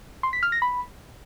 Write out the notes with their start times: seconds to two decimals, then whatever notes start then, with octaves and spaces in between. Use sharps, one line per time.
0.23 C6
0.33 B6
0.43 F6
0.52 A#6
0.62 B5